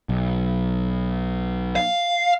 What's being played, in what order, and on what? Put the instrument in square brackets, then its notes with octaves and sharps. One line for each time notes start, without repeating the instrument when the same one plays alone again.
[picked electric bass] B1
[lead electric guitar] F5